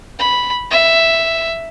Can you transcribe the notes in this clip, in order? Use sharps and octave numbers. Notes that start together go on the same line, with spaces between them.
B5
E5